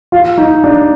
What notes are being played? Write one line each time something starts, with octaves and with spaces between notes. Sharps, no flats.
F4
D#4
D4